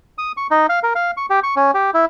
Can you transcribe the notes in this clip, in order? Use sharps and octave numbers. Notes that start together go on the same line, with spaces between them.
D#6
C#6
D#4
F5
A#4
F5
C#6
G4
C#6
C#4
G4
E4